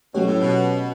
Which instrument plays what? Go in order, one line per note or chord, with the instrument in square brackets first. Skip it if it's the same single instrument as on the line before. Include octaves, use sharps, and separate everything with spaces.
[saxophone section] B2 [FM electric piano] F#3 A3 C#4 G4 C#5
[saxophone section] A2
B2